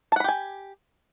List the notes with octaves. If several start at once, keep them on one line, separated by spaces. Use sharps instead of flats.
G4 F#5 G#5 A5 B5